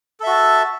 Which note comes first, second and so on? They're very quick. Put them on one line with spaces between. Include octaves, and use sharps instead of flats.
A4 E5 F#4 A5